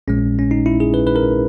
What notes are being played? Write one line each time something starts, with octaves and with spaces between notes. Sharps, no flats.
A#1 A#2 G#3 C#4
C#4
D#4
E4
G#4
B4
B4
A#4